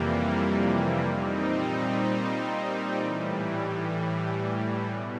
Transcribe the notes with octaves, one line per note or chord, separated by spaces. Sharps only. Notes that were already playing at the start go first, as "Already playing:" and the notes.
Already playing: F2 C3 E3 G3 A#3
A#2 G3 C4 D#4
A2 E3 G3
B2